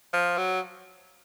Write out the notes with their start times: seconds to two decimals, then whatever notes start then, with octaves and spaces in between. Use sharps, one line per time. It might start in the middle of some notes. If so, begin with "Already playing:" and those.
0.13 F3
0.38 F#3